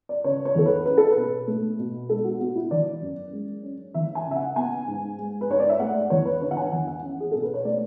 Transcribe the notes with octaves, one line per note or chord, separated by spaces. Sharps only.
D5
C#3 C#5
C#5
E2 A4
B4
C#4 B4
A4
B4
B2
A3
B2
G#3 A4
F#4
B3 F#4
E4
E3 D5
F#2
G#3
C#4
E3 E5
G#5
C#3
E5
F#5
B3 G#5
G#2
G#3
B4
G#2 C#5
D5
E5
A3 F#5
D5
E2 C#5
B4
D3 C#5
F#5
G#5
E2 F#5
F#5
C#4
G#4
B2 A4
B4
C#5
A3 D5